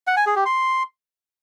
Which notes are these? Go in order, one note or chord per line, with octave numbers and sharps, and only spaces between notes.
F#5
G#5
G#4
G4
C6